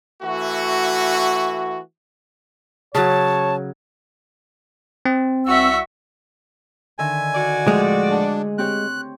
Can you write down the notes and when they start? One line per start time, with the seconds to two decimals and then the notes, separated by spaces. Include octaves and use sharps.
0.22 E3 A3 F#4
2.95 C#3 F#3 C#5 A5
5.05 C4
5.47 C2 F#4 E5 C#6 E6
6.99 D3 D#3 E5 G#5
7.35 F#4 D5
7.68 A2 F3 G#3
8.10 D4 G#4 F#5
8.58 C4 G4 C#5 F#6